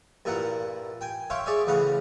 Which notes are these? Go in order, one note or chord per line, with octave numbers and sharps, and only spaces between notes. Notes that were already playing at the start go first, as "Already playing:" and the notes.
G2 A#2 E4 A#4 F#5
G5 G#5
C#5 E5 F5 G5 C6
G#4 C#5 D5 E5 G#5
A1 C#3 F5 F#5 B5